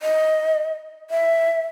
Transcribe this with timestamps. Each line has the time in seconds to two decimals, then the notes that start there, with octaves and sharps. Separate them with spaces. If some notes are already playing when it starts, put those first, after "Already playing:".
0.01 D#5
1.10 E5